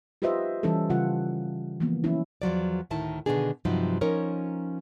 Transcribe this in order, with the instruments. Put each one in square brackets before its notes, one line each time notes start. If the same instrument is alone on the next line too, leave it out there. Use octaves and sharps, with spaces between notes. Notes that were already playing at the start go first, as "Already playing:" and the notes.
[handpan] F4 G4 B4 C5 D#5 E5
E3 G3 C#4 E4 A4
C#3 G3 F4 F#5
E3 F3 A#3 B3
E3 F#3 C#4 E4
[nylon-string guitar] E2 F3 F#3 D5
D2 A2 D#3 E4 A5
B2 D3 D#3 B3 D4 G#4
G2 C3 F3 F#3 D#4
F3 C#4 D#4 A#4 C#5